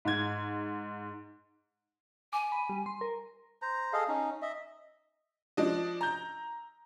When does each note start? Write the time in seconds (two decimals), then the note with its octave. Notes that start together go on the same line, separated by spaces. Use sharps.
0.05 G#2 G#6
2.33 G#5 D6
2.52 B5
2.69 G3
2.86 C6
3.01 A#4
3.62 C5 A#5
3.93 G#4 A4 D#5 F5
4.08 C#4 D#4
4.42 D#5 E5
5.57 F3 D4 D#5
6.01 A#5 G6